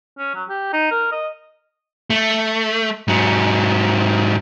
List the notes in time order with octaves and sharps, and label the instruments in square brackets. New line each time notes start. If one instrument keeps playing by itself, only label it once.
[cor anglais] C#4
F#3
G4
D#4
A#4
D#5
[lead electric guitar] A3
G#2 F#3